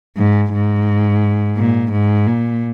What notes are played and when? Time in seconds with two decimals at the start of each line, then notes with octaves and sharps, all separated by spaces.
0.17 G#2
0.53 G#2
1.57 A#2
1.92 G#2
2.27 A#2